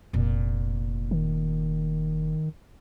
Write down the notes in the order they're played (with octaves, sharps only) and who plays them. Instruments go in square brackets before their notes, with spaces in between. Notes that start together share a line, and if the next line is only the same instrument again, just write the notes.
[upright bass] F1 A#2
[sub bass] D#3